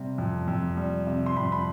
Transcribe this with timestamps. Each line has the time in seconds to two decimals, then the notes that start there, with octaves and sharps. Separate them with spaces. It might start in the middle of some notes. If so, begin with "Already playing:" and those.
Already playing: C3 G3
0.18 F2
0.48 F2
0.77 G3
1.07 C3
1.26 C6
1.37 F2 B5
1.52 B5